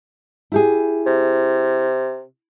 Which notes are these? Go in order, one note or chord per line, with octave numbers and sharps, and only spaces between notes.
E4 G4 G#4
C3